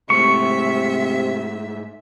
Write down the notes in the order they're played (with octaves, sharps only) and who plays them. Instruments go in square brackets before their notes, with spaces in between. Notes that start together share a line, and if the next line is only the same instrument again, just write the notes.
[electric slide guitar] G#2 A3 [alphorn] C3 [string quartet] E5 [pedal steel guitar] C#6